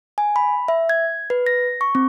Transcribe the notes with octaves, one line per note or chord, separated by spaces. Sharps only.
G#5
B5
E5
G#6
B4
A#6
C#6
C4